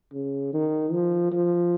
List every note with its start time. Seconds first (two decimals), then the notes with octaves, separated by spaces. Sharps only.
0.13 C#3
0.53 D#3
0.92 F3
1.32 F3